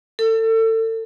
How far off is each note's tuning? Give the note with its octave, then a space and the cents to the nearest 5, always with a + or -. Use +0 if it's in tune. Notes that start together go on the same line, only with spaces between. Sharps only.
A4 +30